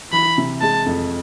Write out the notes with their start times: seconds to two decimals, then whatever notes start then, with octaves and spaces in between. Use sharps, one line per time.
0.12 E3 B5
0.38 C3
0.61 G#3 A5
0.86 F2